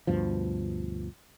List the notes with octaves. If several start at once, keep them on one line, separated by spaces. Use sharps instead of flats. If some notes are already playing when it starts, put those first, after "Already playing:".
D2 G2 B2 F3